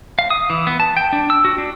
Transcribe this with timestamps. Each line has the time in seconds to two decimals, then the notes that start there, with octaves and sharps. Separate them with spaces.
0.19 F5
0.30 D#6
0.50 E3
0.67 B3
0.80 A5
0.97 G5
1.13 D4
1.30 E6
1.45 F#4
1.58 D4